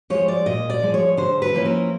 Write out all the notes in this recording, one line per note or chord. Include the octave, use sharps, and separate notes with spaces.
F3 G#3 C#5
D5
A#2 D#5
D5
F3 G#3
C#5
D3 C5
B4
F3 A#3 C#4 E4
A#4